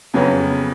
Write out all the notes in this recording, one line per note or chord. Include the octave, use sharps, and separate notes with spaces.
F2 C#3 F#3 B3